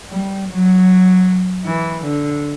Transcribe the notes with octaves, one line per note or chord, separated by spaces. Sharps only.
G3
F#3
E3
D3